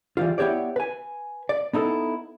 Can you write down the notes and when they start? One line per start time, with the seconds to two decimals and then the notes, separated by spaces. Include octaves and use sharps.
0.17 E3 G3 F4
0.38 B3 E4 G4 C#5 D5
0.76 B4 G#5
1.49 D5
1.73 B3 D#4 E4 A4